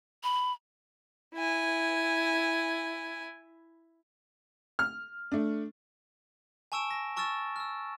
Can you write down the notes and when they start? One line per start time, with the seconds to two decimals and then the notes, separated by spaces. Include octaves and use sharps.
0.23 B5
1.34 E4 G#5
4.79 F6
5.32 A3 D4
6.72 G#5 A5 C#6 E6 D7 E7
6.91 A#6
7.16 A5 C#6 E6 F6 A6 E7
7.56 E6 F6